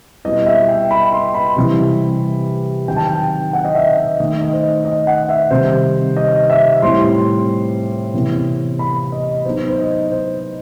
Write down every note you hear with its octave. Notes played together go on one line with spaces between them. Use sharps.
B2 G3 B3 E4 D#5
E5
G5
B5
C6
B5
C3 E3 G3
D#3 F#3 C4 G5
A5
G5
F#5
D#5
E5
D#5
D#3 A3 D#4 D#5
D#5
C5
D#5
D#5
F#5
E5
C3 D#3 G3 C4 D#4 C5
D#5
D#5
E5
A2 G3 C4 E4 C6
C3 E3 B3 E4
B5
D#5
F#3 B3 D#4 C5
C5
D#5
C5